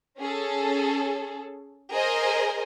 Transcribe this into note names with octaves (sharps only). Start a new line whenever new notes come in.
C#4 G#4 A4
G#4 A#4 C5 D#5 G#5